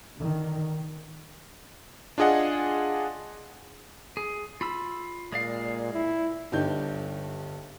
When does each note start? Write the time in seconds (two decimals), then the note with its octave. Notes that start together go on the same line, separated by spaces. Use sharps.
0.16 D3 D#3
2.18 D4 F4 G#4 D#5 F#5
4.17 G#4
4.61 F4 B5 E6
5.32 A#2 G#3 D5 F5
5.93 E4
6.52 G1 G2 D4 D#4 G4 G6